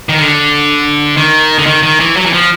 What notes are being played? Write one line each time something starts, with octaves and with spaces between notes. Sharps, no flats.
D#3
D3
D#3
D3
D#3
D#3
E3
F#3
E3
F3